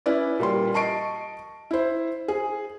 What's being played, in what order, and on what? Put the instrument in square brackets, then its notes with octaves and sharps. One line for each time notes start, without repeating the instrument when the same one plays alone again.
[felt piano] C#4 E4 B4 D5
A#2 G3 C6
D#5 A5 C#6 C7 D7
E4 C5
G#4